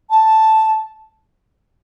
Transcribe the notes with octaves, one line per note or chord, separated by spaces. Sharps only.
A5